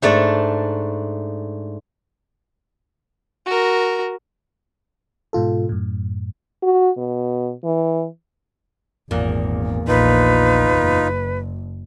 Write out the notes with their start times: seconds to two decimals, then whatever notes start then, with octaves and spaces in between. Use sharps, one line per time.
0.02 G#2 A3 D4 D5
3.46 F#4 A#4
5.33 G#2 B2 F4 A4
5.69 F#2 A2
6.63 F#4
6.97 B2
7.64 E3
9.11 G#1 E2 A#2 A#3
9.88 A#1 D#4 F4 B4
10.72 F#1